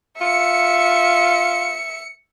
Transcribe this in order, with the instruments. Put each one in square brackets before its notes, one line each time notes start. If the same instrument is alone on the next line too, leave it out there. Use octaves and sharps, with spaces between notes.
[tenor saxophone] F4 [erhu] E5 [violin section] C#7